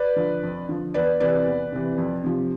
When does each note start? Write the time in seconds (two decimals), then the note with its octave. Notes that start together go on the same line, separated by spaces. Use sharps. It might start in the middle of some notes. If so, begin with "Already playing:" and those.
Already playing: B4 D5
0.16 D3 F3
0.43 F2
0.69 D3 F3
0.94 E2 B4 D5
1.20 C3 E3 B4 D5
1.46 E2
1.72 C3 E3
1.98 F2
2.24 C3 F3